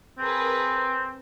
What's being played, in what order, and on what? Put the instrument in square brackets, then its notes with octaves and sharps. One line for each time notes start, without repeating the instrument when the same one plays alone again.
[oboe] C4 [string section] G#4 A#4 B4